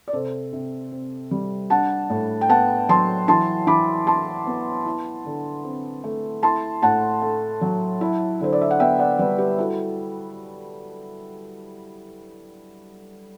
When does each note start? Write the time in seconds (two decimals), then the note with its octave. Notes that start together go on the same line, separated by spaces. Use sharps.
0.08 D5
0.13 C3 A4 C5
0.53 C3
0.92 C4
1.31 G3
1.70 D4 F#5 A5
2.10 A2
2.41 G5
2.49 B3 F#5 A5
2.89 F#3 A5 C6
3.28 E3 A5 C6
3.67 E3 B5 D6
4.07 E4 A5 C6
4.47 B3
4.86 E4
5.25 D3
5.64 C4
6.04 A3
6.43 E4 A5 C6
6.82 A2 F#5 A5
7.22 A3
7.61 F#3
8.01 E4
8.41 D3 C5
8.53 D5
8.62 E5
8.71 F#5
8.80 B3 E5 G5
8.99 D5 F#5
9.19 G3 B4 D5
9.38 G4 B4
9.58 E4 F#4 A4